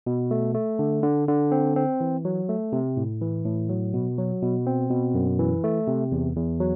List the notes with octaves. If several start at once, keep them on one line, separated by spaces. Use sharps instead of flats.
B2
A3
A3
D3
D3
D3
C4
C4
E3
F#3
A3
C3
A2
E3
A2
F#3
B2
F#3
B2
C4
B2
F#2
E3
A3
C3
E2
E2
F#3